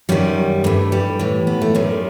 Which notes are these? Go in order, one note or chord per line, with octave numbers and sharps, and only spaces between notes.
F#2 D#3 G3
G2 E3 A3
G3
A2 E3
B3
A3
F#2 D#3 G3